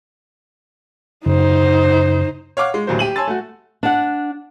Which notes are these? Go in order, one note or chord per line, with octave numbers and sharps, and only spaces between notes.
F#2 C#3 D#4 C5
C#5 F5 F#5 D6 F6
G#3 F4
A1 D2 F#3 G3 A#3 C5
G4 D#7 F#7
C#5 G#5 A5 C6 E6 A6
A3 F#4
D4 F#5